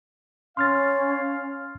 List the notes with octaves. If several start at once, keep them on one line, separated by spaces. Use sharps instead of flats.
C#4 F5 C6 F6 A6